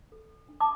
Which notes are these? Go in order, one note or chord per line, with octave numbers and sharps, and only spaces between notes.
A4
D4
A5 D6